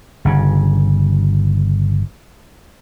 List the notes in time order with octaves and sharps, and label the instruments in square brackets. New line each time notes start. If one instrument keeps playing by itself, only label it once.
[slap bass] G1 C#3